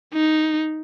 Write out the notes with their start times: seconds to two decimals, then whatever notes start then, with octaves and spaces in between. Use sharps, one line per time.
0.13 D#4